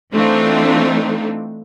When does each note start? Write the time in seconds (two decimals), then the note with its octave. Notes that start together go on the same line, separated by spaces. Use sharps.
0.12 E3 A3 C4 D4 D#4 F4